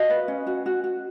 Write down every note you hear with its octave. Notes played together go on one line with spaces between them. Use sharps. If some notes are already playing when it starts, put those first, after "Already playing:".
Already playing: F#4 D#5 F5
B4
C#4
F#4
F#4
F#4